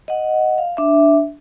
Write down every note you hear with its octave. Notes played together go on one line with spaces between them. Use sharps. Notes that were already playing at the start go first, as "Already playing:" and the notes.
D#5 F#5
F5
D4 E5